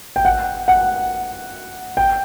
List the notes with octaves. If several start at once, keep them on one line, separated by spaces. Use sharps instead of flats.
G5
F#5
F#5
G5